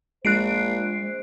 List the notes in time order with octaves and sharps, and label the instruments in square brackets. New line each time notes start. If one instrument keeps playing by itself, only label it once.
[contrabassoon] A#1 [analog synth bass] G#3 [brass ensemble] C5 [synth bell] F#6 C7 D7